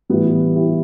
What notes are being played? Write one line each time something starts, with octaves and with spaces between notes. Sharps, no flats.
A2 E3 G3 B3
E4 G4